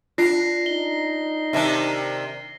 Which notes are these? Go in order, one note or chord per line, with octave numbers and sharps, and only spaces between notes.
D4 F4 F#5 A#6 C7
D#4 G7
C3 D#3 D4 E5 A5